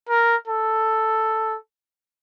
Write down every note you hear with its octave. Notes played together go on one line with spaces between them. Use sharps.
A#4
A4